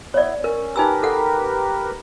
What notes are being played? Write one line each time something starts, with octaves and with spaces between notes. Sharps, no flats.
B3 E4 C#5 D5
C#4 A#4
D#4 G4 A#4 B4 G#5 E6
A4 F#5